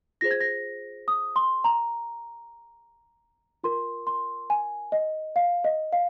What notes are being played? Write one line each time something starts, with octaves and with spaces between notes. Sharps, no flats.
F4 G#4 C5 A#6
G#6
A#6
D#6
C6
A#5
F4 A#4 C6
C6
G#5
D#5
F5
D#5
F5